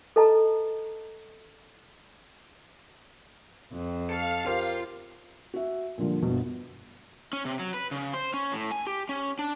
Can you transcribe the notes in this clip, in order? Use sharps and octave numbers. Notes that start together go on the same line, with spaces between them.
A4 B4 D#5 A5 A#5
F2
A4 F5
F4 G4 A#4 C5
F#4 E5
A#2 D3 F3 G3
G1 B2
C#4
C3
F#3
B4
C#3
C5
C#4
A2
G#5
G4
C#4
D4